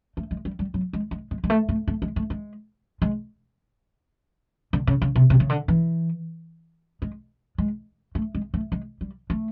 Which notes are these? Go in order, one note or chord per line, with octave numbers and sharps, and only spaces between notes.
A3
G#3
G3
G3
F#3
G#3
G#3
G#3
G#3
A3
A3
A3
G#3
A3
G#3
G#3
D3
C#3
C#3
C3
C3
C#3
D3
E3
G#3
G#3
A3
G#3
A3
G#3
G3
A3